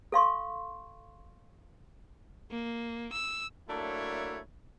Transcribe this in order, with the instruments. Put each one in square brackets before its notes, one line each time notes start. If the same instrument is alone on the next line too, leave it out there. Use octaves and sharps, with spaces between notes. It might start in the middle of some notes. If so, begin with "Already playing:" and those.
[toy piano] A4 F5 C6 C#6
[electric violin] A#3
E6
[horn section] F#3 A3 A#3 D4 E4 C#5